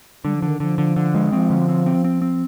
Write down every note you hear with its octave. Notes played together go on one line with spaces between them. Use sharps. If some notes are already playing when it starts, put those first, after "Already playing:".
D3 G3
F3
D3
D#3
D3 F3
D3
D3
G#3
F3 C4
D3
C4
C4
C4
C4